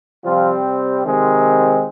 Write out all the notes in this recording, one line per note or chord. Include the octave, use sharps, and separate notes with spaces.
C3 F3 G3 C4 F4
C3 D#3 G#3 C4